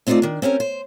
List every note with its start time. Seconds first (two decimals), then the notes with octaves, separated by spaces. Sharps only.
0.07 A3 C4 D#4 F4 A4 D5
0.22 D#3 D4
0.42 C4 C#4 G4 A#4
0.60 C5